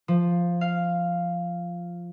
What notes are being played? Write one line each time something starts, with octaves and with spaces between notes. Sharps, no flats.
F3
F5